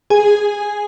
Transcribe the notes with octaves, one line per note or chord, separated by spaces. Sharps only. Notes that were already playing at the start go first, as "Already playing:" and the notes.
G#4 G#5